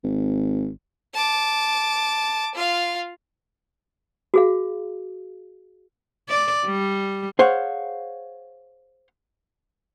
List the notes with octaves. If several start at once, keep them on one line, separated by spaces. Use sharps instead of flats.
G#1
A5 D6
F4 F5
F#4 G#4 F5
D5
G3
G#4 C5 C#5 F5 F#5